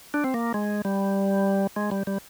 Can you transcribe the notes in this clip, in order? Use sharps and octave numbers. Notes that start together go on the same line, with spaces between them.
D4
C4
A#3
G#3
G3
G#3
G3
G3